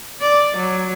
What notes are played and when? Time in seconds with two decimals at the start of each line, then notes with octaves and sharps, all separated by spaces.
0.21 D5
0.57 F#3